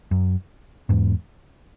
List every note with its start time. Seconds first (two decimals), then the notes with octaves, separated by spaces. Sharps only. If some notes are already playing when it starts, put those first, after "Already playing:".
0.11 F#2
0.89 E2 G#2